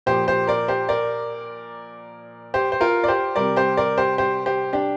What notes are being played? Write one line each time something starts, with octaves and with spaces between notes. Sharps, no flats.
A#2 F3 G4 C5
G4 C5
A#4 D5
G4 C5
A#4 D5
G4 C5
C5
F4 A#4
D5
G4 C5
C3 G3 A#4 D5
G4 C5
A#4 D5
G4 C5
G4 C5
G4 C5
D4 G4